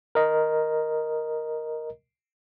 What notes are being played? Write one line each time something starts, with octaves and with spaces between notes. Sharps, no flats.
A#4 D#5